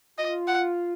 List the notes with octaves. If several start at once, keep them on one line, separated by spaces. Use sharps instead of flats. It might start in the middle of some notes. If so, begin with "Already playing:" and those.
F4 D#5
F#5